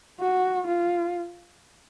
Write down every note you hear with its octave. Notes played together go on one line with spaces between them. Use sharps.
F#4
F4